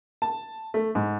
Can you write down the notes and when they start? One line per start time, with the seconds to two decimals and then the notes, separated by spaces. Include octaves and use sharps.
0.22 A5
0.74 A3
0.95 G#2